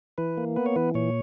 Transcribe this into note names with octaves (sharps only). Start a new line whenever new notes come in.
E3 B4
A#3
B3 B4
C#5
E3 B4
A#2 C#5